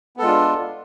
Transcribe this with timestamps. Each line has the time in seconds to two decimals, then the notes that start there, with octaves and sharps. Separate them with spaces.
0.17 B3
0.19 A4
0.22 G#3
0.24 F4
0.27 D4